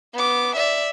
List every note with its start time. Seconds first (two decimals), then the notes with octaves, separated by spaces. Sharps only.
0.14 B3 D6
0.56 D5 E5